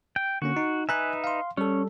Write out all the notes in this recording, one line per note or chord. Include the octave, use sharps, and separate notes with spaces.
G5
D3 A#3 C#4 F#4
D#4
D#4 B4 E5 G#5 A#5 F#6
F5 C6
G3 C#4 A4